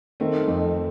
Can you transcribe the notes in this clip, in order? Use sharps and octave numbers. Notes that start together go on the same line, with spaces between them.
D#3 A3 C4
F2